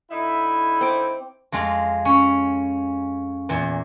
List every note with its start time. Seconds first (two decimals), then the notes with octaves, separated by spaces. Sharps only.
0.11 D3 D#4 E4
0.81 C4 D6
1.52 F2 G#3 F4 F5
2.05 C#4
3.49 E2 A#2